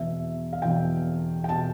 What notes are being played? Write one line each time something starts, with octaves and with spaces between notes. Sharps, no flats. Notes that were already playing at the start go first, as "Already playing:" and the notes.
Already playing: E2 B2 E5
F5
E2 B2 G5
G5
B2 A5